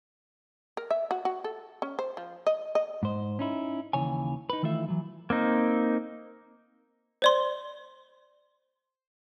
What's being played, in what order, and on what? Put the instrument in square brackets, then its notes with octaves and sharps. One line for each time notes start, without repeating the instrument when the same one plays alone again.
[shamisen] A#4
E5
F#4
F#4
A4
C#4
C5
F3
D#5
D#5
[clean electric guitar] G#2 C5
C#4 D#4 E4
D#2 C#3 E3 C#5 G#5
D#4 B4
D#3 E3 A3 F4 E5
E3 F#3
[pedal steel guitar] A#3 C4 D#4
[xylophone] C5 D5 C6